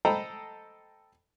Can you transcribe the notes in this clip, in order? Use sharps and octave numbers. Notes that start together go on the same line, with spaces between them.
A4 C5 D#5 G5 A#5 B5